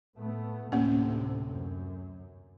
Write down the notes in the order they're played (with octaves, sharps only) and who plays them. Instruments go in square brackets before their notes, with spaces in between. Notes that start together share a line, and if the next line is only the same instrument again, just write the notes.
[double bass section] A2 A3 B3
[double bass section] D2 A2 C3 [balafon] A#3 C#4
[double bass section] F#2